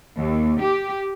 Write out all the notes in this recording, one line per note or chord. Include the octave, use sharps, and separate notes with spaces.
D#2
G4